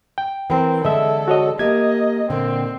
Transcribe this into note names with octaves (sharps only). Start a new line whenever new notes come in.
G5
E3 C4 A#4
D3 G#3 A4 D#5 E5
F#4 C#5 D#5
A#3 G4 D#5 E5 G#6
A#2 D3 C4